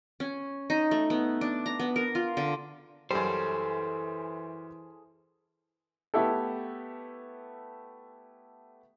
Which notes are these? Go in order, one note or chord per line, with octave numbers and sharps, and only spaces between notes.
C#4
D#4
A3
B3
D4
A#5
B3
A#4
F4
D3
F#2 E3 G3 G#4 A4 C5
A3 B3 E4 G4 A4